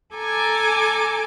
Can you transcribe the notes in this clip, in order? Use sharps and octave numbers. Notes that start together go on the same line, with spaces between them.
A4 G#5 A#5 D6